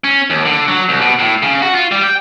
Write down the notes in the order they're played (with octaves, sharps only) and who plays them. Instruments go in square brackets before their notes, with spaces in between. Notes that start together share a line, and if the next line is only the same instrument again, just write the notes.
[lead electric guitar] C#4
D#2
D3
F#3
C2
B2
A2
C#3
F#4
F4
G3
G5